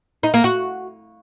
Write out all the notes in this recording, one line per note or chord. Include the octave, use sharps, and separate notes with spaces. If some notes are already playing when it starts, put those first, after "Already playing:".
D#4
A#3
F#4